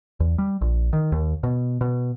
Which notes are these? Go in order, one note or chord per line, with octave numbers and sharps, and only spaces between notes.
E2
G3
A#1
D#3
D#2
B2
B2